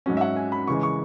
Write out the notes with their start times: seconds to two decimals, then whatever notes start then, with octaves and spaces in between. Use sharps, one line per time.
0.06 G#2 F#3 C#4
0.17 E5
0.21 F#5
0.36 G#5
0.52 B5
0.67 C#3 E3 G#3 C#6
0.83 C#6